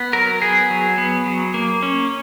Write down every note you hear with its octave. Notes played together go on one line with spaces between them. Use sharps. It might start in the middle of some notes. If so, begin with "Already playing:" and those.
Already playing: B3
F#3 A#4
B3 G#4
F#3
B3
F#3
A#3
C#4